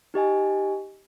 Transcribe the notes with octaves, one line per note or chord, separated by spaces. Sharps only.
D#4 G4 D#5 G#5